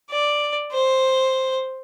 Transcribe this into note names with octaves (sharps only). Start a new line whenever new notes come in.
D5
C5